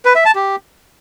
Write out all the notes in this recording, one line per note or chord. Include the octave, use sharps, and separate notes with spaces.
B4
E5
A5
G4